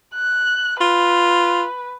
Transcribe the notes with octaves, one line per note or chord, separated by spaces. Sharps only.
F#6
F4 B4